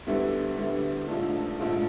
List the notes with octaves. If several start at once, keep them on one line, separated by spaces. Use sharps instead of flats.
D2 D3 G3 B3 E4
D2 D3 G3 B3 E4
A#1 G#2 F3 A3 D4
A#1 G#2 F3 A3 D4